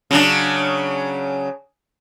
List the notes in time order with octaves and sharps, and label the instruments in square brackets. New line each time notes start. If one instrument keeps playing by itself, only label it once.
[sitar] C#3 F#3 D4